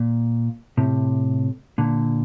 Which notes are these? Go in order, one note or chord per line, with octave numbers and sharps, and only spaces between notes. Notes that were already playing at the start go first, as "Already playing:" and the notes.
Already playing: A#2
A2 C3
A#2 D3